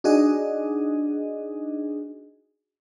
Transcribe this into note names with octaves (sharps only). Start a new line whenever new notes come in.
D4 D#4 F#4 G#4 D#5